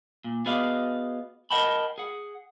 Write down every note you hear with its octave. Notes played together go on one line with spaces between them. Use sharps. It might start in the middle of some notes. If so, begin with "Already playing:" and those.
A#2
B3 F#4 G#4 D5 D#5 F5
A#4 D#5 F#5 G5 A5 B5
G#4 F#5